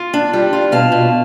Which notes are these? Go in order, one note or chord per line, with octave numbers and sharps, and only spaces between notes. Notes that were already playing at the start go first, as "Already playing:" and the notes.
Already playing: F4
D4
G3
F4
B2 F5 A5
B2